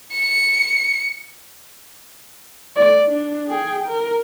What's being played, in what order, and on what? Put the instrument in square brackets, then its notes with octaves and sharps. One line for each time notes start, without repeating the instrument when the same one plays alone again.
[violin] C#7
[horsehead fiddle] A3 D5
D4
G#4 G5
A#4